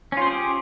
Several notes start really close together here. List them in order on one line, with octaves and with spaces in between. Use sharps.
C#4 F4 C5 G#4 G4